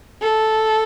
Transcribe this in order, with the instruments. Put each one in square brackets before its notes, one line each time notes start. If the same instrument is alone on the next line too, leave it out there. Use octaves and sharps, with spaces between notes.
[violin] A4